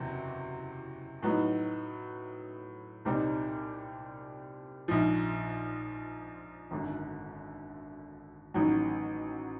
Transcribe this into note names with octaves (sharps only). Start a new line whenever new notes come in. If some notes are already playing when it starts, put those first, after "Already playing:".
Already playing: F#1 E2 C3 F#3
A2 F#3 B3 D#4
C2 A#2 G3 C4 D#4
A#1 G#2 F3
G#1 F#2 D3
A1 G#2 D#3 F#3